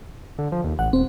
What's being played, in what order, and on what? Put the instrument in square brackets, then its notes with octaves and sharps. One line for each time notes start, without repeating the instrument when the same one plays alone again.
[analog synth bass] D3
F3
D#2
[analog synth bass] A1 [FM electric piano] F#5
[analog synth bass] D#1 [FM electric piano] C4